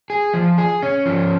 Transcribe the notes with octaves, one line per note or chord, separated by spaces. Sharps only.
G#4
F3
G#4
C#4
F3